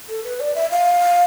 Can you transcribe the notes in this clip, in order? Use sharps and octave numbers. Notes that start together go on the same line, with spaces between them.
A4
B4
D5
E5
F5